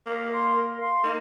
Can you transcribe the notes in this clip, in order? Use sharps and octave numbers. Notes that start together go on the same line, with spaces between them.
A#3 A#4
F5 C6
A#4
F5 C6
A#3 D#4